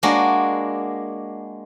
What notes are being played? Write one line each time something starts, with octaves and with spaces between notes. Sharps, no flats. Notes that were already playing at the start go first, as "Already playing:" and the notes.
G#3 A#3 D4 F#4